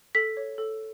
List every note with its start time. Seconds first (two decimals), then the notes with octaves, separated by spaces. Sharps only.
0.15 A4 B6
0.37 C#5
0.58 A4